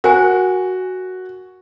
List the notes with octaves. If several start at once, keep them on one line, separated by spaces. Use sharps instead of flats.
F#4 A#4 C5 G#5